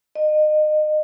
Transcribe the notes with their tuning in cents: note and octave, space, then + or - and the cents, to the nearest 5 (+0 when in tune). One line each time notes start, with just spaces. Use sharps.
D#5 -30